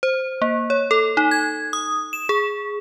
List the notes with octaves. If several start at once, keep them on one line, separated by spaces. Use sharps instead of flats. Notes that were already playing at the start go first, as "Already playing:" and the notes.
C5
A#3
C#5
A4
D#4
G#6
D#6
E7
G#4